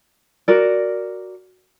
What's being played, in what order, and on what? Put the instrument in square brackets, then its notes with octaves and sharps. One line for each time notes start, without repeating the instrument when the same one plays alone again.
[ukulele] F#4 A#4 D5